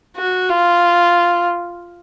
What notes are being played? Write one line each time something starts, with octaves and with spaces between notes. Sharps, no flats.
F#4
F4